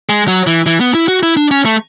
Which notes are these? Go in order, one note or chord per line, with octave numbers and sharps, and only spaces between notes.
G#3
F#3
E3
E3
B3
E4
F#4
E4
D4
C#4
A3